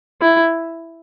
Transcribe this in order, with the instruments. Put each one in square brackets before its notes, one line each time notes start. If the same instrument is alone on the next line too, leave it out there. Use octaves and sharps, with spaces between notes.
[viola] E4